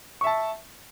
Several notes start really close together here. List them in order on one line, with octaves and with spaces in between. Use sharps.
C#6 E5 A5